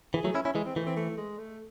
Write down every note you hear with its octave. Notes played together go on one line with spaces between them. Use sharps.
E3 G#4
F#3 A3
C#4 E4
C#4 E4
E3 G#3
C4
E3 A3
C4
A3
G#3
A3